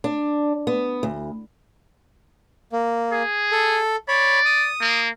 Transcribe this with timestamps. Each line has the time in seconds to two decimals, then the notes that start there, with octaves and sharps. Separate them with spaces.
0.04 D4
0.67 B3
1.03 D2
2.73 A#3
3.12 G#4
3.52 A4
4.08 C#5 D5 B5
4.45 D#6
4.81 A#3